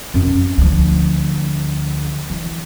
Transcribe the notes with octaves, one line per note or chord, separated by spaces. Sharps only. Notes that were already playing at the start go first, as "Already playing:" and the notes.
F#2 C#4
C#4
D2 F3
E3